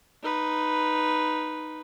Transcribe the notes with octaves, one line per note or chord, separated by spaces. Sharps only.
D#4 B4